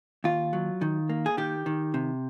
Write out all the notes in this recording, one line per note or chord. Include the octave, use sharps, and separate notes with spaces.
D#2 F4
F#3
D#3
A#3
G#4
D#3 G4
D#3
C3